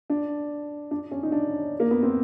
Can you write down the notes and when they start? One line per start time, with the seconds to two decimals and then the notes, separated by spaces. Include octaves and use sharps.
0.10 D4
0.91 D4
1.11 C#4
1.23 D#4
1.32 D4
1.80 A#3
1.91 B3
2.03 C4